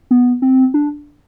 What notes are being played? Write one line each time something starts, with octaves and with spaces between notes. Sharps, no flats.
B3
C4
D4